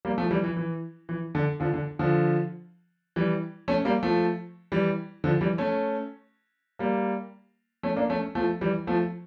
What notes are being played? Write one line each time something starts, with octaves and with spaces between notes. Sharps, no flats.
G3 A#3
F3 A3
E3 G3
E3
E3
E3
D3
D3 F3
D3
D3 F3
E3 G3
A3 C#4
G3 A#3
F3 A3
E3 G3
D3 F3
E3 G3
A3 C#4
G3 A#3
A3 C#4
A#3 D4
A3 C#4
F3 A3
E3 G3
F3 A3